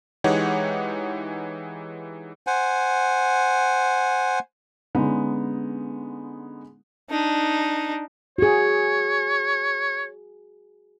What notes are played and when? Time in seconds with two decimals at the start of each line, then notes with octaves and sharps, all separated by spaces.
0.24 E3 G#3 D#4 G4 C#5 F#5
2.47 C5 F#5 G#5
4.95 D3 G#3 B3 C#4 D#4
7.10 D4 D#4
8.38 F#4 G#4 C#5